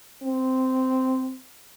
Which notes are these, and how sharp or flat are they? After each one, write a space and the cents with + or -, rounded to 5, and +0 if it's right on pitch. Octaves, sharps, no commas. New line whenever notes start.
C4 -10